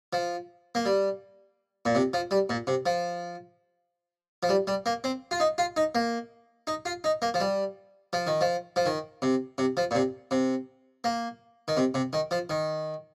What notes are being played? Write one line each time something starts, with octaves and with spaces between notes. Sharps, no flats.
F3
A#3
G3
A#2
C3
F3
G3
A#2
C3
F3
F3
G3
G3
A#3
C4
F4
D#4
F4
D#4
A#3
D#4
F4
D#4
A#3
F3
G3
F3
D#3
F3
F3
D#3
C3
C3
F3
A#2
C3
C3
A#3
D#3
C3
C3
D#3
F3
D#3